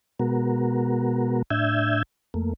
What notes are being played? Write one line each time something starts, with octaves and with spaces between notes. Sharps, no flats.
B2 G#3 B3 F#4 A#4
A2 D4 E5 E6 G6 G#6
F2 A3 A#3